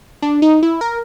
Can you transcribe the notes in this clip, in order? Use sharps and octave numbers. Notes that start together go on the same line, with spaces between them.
D4
D#4
E4
A#4